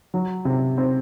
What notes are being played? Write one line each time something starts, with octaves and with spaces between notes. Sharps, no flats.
F#3
C3
C4